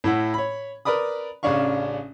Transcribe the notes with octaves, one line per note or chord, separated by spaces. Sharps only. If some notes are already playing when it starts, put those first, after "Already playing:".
A2 E4 F#5
C#5 B5
A#4 B4 D5 B5 D#6
A1 C#3 C#4 D4 F5 C#6